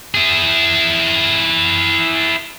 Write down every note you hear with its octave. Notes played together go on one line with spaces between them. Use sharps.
E4 G#4